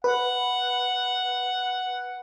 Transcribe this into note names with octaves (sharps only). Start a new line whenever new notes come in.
B4 F#5